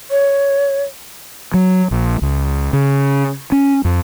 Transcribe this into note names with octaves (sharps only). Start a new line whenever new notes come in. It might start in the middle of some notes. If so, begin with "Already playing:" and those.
C#5
F#3
A#1
C#2
C#3
C#4
F2